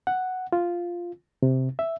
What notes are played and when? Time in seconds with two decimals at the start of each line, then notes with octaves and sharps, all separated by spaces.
0.07 F#5
0.53 F4
1.43 C3
1.79 E5